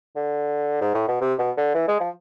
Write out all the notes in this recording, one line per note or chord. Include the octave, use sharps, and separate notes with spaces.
D3
G#2
A2
B2
C3
B2
D3
E3
G#3
F3